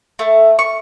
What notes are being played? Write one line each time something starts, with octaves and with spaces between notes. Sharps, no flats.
A3
C#6